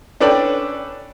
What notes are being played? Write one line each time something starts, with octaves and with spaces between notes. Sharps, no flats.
C#4 D4 A4 B4 D5 G5